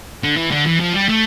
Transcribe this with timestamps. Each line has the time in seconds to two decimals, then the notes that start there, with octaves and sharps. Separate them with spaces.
0.24 D3
0.37 E3
0.51 D3
0.66 E3
0.80 F3
0.94 G3
1.09 A3